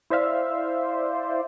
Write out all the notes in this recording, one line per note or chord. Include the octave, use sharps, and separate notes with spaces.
E4 C5 D5 E5 F5